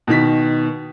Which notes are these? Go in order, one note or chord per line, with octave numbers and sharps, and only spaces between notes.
B2 D#3 B6